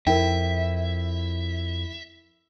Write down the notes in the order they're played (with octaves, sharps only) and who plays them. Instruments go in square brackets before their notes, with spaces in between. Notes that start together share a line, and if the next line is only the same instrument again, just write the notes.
[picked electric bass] F2 [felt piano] E4 [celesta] A#4 G5 [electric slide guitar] E5